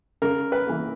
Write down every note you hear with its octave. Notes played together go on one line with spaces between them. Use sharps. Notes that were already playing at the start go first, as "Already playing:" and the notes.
C#3 A#4
B4
E3 A#3